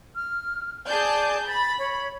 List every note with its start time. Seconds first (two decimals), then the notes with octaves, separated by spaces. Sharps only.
0.16 F6
0.86 G#4 D5 A5 G6
1.48 B5 A6
1.79 C#5